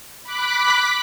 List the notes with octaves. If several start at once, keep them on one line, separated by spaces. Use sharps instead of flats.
B5 D6 F#6 B6